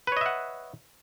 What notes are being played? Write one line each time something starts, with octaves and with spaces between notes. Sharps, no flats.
B4 C#5 D#5 E5 F#5